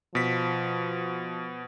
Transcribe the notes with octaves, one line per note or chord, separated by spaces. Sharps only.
B2 F3 B6